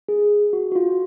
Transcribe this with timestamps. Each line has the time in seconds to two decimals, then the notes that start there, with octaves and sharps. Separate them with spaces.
0.09 G#4
0.53 F#4
0.72 F#4
0.75 F4